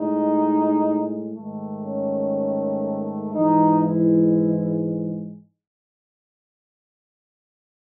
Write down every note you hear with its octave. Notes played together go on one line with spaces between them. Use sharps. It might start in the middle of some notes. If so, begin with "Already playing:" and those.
Already playing: A2 G#3 D#4
G#2 D#3 A3
C#4
G#2 E3 G#3 D#4
E4